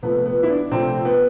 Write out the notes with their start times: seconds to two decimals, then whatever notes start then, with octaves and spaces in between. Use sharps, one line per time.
0.02 C3 F3 A3 B3
0.26 B3
0.43 E4
0.49 D4
0.71 C3 F3 A3 C4
1.05 B3